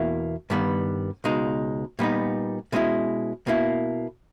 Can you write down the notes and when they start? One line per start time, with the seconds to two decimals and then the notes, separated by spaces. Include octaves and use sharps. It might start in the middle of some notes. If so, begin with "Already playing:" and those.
Already playing: E2 B2 A#3 E4
0.50 G2 D#3 G3 B3
1.24 C#2 B2 G#3 D#4
1.99 A#2 G3 B3 D#4
2.72 B2 G#3 C#4 E4
3.47 B2 A#3 E4